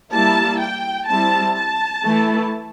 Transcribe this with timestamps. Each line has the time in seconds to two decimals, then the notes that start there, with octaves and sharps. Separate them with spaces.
0.12 G3 A#3 E4 A5
0.60 G5
1.07 G3 C4 E4 A5
1.56 A5
2.03 E3 A3 E4